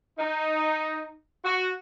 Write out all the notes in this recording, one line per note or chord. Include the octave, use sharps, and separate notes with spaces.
D#4
F#4